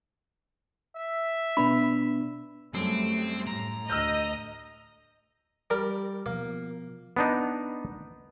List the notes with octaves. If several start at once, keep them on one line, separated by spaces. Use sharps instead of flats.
E5
B2 B3 D4 B5
F#2 G3 A3 C4
A2 A#5
D2 D#5 E6 F6 G6
G3 A#4
B2 F3 A#3
B3 D4 D#4